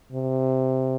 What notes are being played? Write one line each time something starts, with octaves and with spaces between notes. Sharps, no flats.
C3